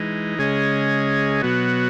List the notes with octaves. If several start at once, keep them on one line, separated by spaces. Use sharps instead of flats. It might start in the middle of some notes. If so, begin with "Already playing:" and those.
Already playing: E3 G#3 D#4
C#3 G#3 C#4 G#4 D#5
B2 F#3 B3 F#4